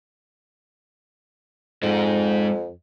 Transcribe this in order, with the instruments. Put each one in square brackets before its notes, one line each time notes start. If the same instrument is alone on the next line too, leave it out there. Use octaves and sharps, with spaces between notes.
[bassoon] F2 [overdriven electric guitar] G#2 G#3